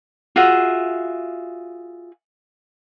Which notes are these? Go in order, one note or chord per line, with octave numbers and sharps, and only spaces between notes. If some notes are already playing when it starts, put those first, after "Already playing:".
F4 F#4 G#4 E5